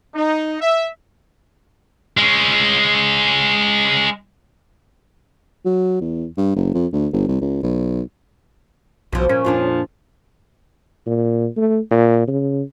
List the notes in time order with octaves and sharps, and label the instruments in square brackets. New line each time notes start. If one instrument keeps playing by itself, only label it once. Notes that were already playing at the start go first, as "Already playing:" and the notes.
[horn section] D#4
E5
[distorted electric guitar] G#3 C#4
[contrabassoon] F#3
E2
G2
F#1
F2
D2
G1
C2
C#2
B1
[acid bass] B1 [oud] B2 F3
[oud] A#2 [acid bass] C#4
[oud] F2 A#2 D4 [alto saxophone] F3
[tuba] A#2
A3
A#2
C#3